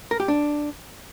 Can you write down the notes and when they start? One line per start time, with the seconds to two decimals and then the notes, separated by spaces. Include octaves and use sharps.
0.11 A#4
0.20 G4
0.28 D4